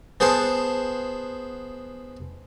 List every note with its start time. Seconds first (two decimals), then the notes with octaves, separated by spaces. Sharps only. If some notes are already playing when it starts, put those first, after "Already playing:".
0.20 B3 G#4 C5 F#5 A5